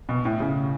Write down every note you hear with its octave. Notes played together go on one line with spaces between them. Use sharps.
B2
A2
C#3